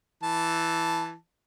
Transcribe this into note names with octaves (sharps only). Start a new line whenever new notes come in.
E3 A5